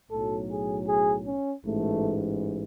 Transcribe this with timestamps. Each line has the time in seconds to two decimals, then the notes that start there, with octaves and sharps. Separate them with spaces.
0.10 B1 A2 F#3 A4
0.49 G#4
0.87 G#4
1.26 C#4
1.66 A1 G#2 E3 A3